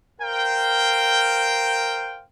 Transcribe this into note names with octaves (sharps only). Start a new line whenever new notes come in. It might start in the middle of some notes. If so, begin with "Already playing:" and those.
A#4 C5 F5 G5